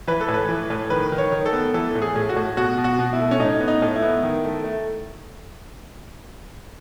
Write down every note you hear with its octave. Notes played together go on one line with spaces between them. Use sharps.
E3 B4
A4
A2
B4
E3
A2
D#3 B4
D#3
C#5
D#3
A4
B3
E3 A4
A2
G#4
A2
F#4
A2
B2 F#4
B2
F#4
B2
E4
A3
C#4
A2 D#4
B3
D#4
A2
E4
B3
D#3
A3
A3